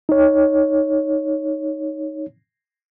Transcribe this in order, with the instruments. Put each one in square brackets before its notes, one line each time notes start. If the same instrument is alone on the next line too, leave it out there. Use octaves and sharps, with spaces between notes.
[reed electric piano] D#4 C#5